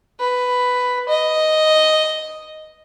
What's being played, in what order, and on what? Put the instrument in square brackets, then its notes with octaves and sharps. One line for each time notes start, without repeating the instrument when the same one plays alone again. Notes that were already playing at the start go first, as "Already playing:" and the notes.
[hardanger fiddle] B4
D#5